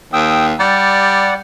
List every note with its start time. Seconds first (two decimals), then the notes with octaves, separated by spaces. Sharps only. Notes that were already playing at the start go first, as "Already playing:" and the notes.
0.13 D#2 G5 D#6 E6
0.60 G3 D5 F#5